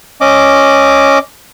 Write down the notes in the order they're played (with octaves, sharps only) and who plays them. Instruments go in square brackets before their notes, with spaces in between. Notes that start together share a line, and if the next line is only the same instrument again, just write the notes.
[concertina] C#4 D#5 D6